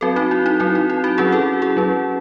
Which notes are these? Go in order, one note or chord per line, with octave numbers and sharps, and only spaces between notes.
F#3 C4 F#4 A4
D#4 F#4
E4
D#4
F#3 C4 E4
D#4
E4
D#4 F#4
F#3 C#4 E4 G#4
F#4 A4
E4 G#4
F#3 C#4